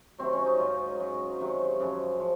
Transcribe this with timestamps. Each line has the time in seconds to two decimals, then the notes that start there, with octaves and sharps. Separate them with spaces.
0.19 C3 D#3 F#3 C4
0.33 C#4
0.46 D#4
0.59 G#2 F#3 F4
0.99 G#2 F#3
1.40 C3 D#3 F#3
1.80 F#2 C#3 F3
2.20 F3